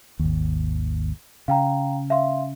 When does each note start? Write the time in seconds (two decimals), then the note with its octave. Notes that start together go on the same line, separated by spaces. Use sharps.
0.19 G#1 D#2
1.48 C#3 F5 G5 A#5
2.10 E5 F5 C6